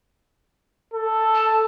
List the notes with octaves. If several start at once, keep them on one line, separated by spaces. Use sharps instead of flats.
A4
A5